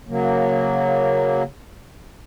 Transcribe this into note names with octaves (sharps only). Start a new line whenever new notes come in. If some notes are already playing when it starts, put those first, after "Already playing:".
C#3 F#3 A#3